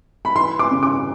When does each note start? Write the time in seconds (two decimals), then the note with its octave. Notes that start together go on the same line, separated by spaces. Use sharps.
0.25 B5
0.35 E3 C6
0.59 D6
0.71 C#3
0.83 D6